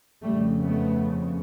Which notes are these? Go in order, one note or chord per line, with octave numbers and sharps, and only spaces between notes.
F2 C#3 G3 A3
A3 B3